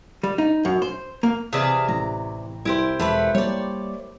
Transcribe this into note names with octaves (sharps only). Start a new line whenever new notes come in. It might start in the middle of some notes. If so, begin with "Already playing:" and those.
G3
D#4
F#2
C5
A#3
C3 E3 G#4 D5 E5 F5
A1 A#5
C2 E4 G4 C5
E1 E3 A3 B4
G3 A#3 C#5 D5